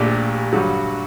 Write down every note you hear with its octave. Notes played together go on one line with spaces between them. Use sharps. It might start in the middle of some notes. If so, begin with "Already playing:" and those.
Already playing: A#1 A#2 A3 D4 G4
G2 D3 F#3